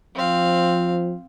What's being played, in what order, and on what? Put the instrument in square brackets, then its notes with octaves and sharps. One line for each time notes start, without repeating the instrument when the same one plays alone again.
[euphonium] F3 [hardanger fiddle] C4 F5